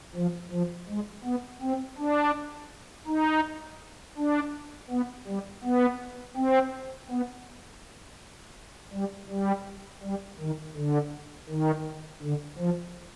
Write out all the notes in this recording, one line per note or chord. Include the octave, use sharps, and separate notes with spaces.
F3
F3
G#3
B3
C4
D4
D#4
D4
B3
G3
B3
C4
B3
G3
G3
G3
D#3
D3
D#3
D3
F3